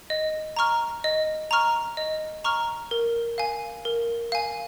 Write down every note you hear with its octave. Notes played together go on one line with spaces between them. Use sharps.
D#5
A#5 C#6 F6
D#5
A#5 C#6 F6
D#5
A#5 C#6 F6
A#4
F5 G#5
A#4
F5 G#5